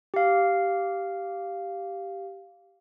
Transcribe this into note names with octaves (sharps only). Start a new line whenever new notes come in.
G4 F5